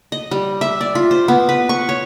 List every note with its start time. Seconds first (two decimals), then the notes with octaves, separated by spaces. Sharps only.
0.12 D#5
0.31 G3
0.61 E5
0.81 D5
0.95 F4
1.11 C5
1.28 B3
1.49 B4
1.69 C#6
1.89 C#5